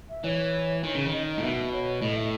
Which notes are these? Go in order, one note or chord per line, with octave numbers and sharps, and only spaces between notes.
E5
E3 C#5
D#3
C#3
D#3
D#5
D#5
A2
B2 E5
C#5
A2 D#5
E5